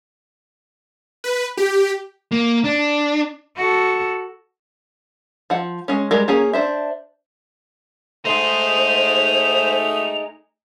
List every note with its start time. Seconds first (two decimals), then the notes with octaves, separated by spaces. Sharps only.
1.24 B4
1.57 G4
2.32 A#3
2.64 D4
3.57 F#4 A4
5.50 F3 F#5
5.88 G#3 C#4
6.11 G3 G#3 A#4
6.28 A#3 C#4 G#4
6.53 D4 C5 E5
8.25 A3 D#4 G#4 C5 F7